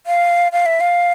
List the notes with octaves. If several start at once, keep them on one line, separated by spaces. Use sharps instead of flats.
F5
F5
E5
F5